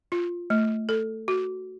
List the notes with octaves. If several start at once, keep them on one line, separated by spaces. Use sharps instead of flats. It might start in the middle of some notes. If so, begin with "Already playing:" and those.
F4
A3
A4
F#4